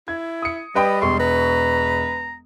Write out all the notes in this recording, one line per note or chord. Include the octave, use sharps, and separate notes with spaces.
E4 G#6
D#6 C#7
G3 B4 D#5 G5 B5
E1 C6 C#6
B4 A#5